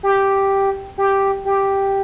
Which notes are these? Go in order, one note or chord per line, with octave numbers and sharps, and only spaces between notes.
G4
G4
G4